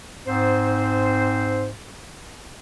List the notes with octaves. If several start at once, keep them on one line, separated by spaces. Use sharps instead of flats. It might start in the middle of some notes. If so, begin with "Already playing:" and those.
G#2 C4 C5